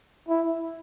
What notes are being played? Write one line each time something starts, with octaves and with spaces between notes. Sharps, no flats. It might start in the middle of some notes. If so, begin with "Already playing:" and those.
E4